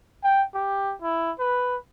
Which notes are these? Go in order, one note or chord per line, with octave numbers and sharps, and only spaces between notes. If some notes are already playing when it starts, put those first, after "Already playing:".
G5
G4
E4
B4